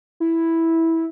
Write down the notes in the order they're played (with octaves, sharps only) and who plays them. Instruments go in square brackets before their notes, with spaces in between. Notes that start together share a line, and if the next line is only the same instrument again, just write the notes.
[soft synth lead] E4